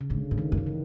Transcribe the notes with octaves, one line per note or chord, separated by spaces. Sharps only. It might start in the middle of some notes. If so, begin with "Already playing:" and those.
C#3
G#2 D3
G#2
D#3
F#2
D#3
E3